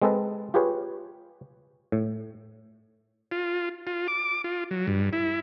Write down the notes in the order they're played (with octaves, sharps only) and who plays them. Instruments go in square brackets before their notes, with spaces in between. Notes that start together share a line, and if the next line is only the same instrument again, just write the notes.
[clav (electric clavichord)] G#3 C4 G#4 A4 B4 D#5
F4 G4 G#4 B4 C#5
A2
[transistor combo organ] F4
F4
D6
F4
F#3
G2
E4